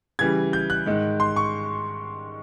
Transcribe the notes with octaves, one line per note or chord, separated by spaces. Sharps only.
C#3 E3 G3 G#6
G6
F#6
G#2 D#3 G#3
C6
C#6